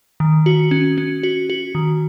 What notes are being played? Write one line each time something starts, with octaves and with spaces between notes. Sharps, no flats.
D#3
F#4
C#4
C#4
F#4
F#4
D#3